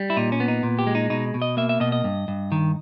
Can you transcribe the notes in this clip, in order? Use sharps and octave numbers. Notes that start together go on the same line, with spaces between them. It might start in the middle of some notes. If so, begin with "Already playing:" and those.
Already playing: G3
E4
A#2 D#4
C#4
B3
D#4
A#2
G4
G#3
D#4
B2 D#4
B2
D#5
A#3 E5
E5
B2 D#5
D#5
G2
G2
D#3